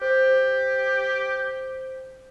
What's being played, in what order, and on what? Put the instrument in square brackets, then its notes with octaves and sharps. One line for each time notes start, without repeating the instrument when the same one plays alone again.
[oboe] G4 [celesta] C5